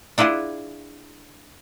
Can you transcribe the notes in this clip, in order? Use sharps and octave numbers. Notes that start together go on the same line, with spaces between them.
D4 E4 F4 G#4 F#5